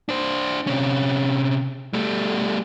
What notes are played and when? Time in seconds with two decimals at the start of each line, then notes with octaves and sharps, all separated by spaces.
0.09 D4 C5
0.67 C3 C#4
1.93 G3 A3